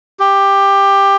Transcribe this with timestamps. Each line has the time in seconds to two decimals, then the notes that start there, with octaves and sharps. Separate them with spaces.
0.19 G4